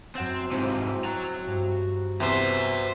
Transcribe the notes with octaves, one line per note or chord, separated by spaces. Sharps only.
F#2 C4 F#5 A6
G#2 C3 C4 E4 C5 D#5
F#4 C5 A#5 A6
G2
E2 C3 B4 C5 E5